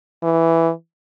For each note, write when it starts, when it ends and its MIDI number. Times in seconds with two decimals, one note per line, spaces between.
0.23 0.71 52